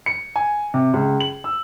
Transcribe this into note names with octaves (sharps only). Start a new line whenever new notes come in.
C#7
G#5
C3
C#2
F#7
E6